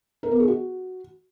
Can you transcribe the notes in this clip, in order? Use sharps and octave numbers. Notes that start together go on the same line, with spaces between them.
A#4
B3
G#4
F#4